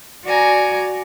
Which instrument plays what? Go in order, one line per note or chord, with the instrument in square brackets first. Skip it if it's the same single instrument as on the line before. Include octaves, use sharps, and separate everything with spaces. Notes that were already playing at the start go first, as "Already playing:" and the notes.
[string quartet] F#4 D5 G#5 A#5